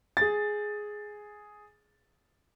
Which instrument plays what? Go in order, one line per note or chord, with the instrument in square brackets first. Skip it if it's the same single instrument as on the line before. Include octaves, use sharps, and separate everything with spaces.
[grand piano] G#4 A6